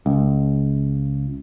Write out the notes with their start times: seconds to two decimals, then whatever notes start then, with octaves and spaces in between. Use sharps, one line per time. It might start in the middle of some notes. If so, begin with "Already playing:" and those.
0.06 C#2